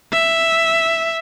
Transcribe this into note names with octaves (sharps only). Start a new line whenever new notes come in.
E5